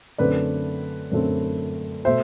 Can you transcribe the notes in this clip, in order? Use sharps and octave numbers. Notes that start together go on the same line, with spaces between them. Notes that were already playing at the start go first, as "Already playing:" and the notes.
F#2 D3 A3 C4 B4 D5
F#2 D3 A3 C4
B2 A3 C5 E5